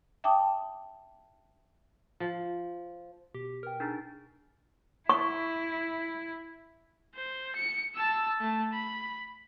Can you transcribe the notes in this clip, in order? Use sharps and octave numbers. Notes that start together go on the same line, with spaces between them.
E5 G5 A5 D6 D#6
F3
B2 G4
A#4 B4 G5 F6
D4 D#4 G#4 A#5 F6 A6
E4 C#6
C5
C#7
A5 E6
A3 A5
B5